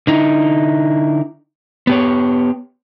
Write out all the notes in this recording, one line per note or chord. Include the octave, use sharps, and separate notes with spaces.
D3 D#4 E4
B3 G4 C#5